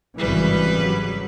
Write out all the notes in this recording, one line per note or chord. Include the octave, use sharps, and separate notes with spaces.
G#1 C#3 E3 G3 B4
F#3